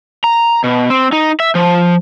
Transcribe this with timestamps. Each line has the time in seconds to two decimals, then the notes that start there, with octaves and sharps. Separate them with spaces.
0.24 A#5
0.64 B2
0.90 C4
1.12 D#4
1.40 E5
1.55 F3